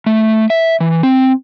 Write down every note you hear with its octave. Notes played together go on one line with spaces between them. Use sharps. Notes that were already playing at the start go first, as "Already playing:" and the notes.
A3
E5
E3
C4